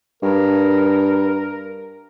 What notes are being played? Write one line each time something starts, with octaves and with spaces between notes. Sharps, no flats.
G2 A#4